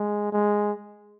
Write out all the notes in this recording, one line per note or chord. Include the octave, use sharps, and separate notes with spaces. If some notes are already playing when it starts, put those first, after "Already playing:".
Already playing: G#3
G#3